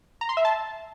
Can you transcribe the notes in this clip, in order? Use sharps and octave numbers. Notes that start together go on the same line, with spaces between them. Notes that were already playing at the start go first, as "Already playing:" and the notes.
A#5
C6
E5
A5